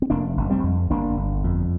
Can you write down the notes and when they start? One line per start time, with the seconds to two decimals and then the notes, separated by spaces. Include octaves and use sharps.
0.02 C4
0.10 F1 A#3 D4
0.37 F1
0.50 G3 C4
0.63 F2
0.90 G1 A#3 D4
1.17 G1
1.44 F2